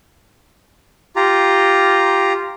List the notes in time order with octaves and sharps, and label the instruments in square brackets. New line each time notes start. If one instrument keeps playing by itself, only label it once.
[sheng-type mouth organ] F4 G4 A#5